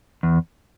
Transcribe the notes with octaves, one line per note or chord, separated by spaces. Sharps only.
E2